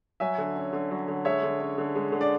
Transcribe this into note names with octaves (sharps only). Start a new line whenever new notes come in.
F#3 E5 G#5
D3
C#4
D3
F#3
D3
G#3 C#5 E5
D3
C#4
D3
G#3
D3
D5